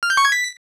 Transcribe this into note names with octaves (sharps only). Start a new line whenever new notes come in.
F6
G6
C#6
G#6
B6